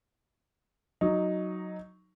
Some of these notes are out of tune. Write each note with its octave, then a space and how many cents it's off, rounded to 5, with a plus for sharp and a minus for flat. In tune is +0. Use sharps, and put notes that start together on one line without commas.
F#3 +0 D#4 +0